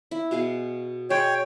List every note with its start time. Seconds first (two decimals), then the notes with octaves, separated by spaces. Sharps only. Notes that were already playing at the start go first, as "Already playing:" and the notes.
0.11 E4
0.31 B2 G#4 F5
1.10 G#3 C#5 G5